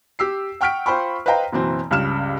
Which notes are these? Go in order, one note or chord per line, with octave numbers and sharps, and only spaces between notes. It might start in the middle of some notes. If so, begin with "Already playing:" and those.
G4 E6 C7
F#5 G5 C#6 F6 B6 D7
F4 C5 G5 B5 C#6
B4 C5 D#5 F5 G5 A#5
F#1 B2 E3 C4
C#2 G2 C#3 F6 E7